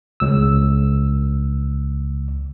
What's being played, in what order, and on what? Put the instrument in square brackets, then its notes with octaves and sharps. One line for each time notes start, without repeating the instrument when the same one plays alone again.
[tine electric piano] C#2 E6